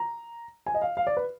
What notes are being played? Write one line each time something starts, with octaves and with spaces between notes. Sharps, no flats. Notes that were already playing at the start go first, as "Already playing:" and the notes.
Already playing: A#5
G#5
D#5
F5
F5
D5
B4